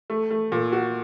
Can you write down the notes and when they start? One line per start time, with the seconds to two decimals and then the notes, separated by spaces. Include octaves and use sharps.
0.10 A3
0.31 A3
0.52 A#2
0.72 F#4